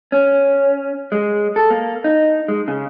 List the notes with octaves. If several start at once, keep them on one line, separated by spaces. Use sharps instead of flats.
C#4
G#3
A4
A#3
D#4
G#3
C#3